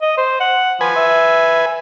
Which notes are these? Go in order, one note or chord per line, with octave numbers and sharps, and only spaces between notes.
D#5
C5
F#5
F3 B4 G#5
E5